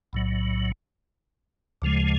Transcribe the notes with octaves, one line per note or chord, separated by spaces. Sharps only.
B1 A2 F#3
D2 C#3 F3 G#3